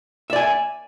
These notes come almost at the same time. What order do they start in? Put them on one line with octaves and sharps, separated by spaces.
E5 D5 G#5